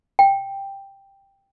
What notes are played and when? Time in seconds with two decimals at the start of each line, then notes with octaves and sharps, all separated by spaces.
0.19 G5